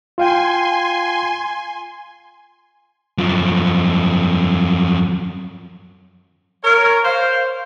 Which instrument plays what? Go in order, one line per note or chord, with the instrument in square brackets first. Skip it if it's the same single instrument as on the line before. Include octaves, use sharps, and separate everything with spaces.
[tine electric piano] F4 F5 G5 [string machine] G#5 C6
[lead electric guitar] F#2 F3
[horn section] A#4 C#5
C5 F5